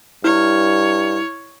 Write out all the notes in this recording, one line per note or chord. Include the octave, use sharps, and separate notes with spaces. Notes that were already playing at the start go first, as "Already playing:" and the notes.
G2 E4 C#5 F6